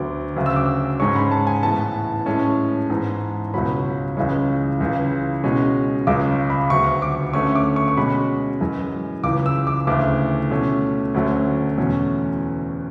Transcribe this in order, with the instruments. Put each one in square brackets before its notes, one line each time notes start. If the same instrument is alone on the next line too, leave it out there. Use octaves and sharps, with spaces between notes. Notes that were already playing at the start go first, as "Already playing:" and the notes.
Already playing: [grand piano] D2 D3 F#3 B3 D6
D2 C#3 F#3
E6
D6
E6
G#2 G#3 C#4 C#6
B5
A5
G#5
A2 E3 B3 A5
A2 G#3 C#4 A5
G#2 E3 B3
C#2 B2 F#3 C#4 B5
C#2 C#3 E3 G#3 C#4
C#2 C#3 E3
B2 G#3 C#4
C#2 C#3 G#3 C#4 D6
B5
D2 D3 F#3 B3 C#6
D6
D2 D3 A3 C#4 C#6
D6
C#6
C#6
B2 G#3 C#4 B5
F#2 E3 G#3
C#2 C#3 E3 D6
E6
D6
D2 C#3 E3 A3 D6
B2 A3 C#4
D2 D3 F#3 A3 C#4
E2 B2 A3 C#4